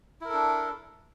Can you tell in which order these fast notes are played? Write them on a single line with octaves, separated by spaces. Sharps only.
E4 A#4 A4 D4